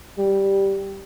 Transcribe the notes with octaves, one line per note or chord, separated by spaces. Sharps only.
G3